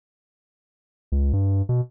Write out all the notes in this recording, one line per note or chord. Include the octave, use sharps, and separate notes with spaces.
C#2
G2
B2